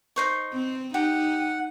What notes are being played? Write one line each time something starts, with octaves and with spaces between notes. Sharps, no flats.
D#4 C5 C#6
C4
D#4 G4 F#5